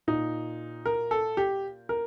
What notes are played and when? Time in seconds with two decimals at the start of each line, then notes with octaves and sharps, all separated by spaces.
0.07 A#2 D#4
0.86 A#4
1.11 A4
1.37 G4
1.89 A#4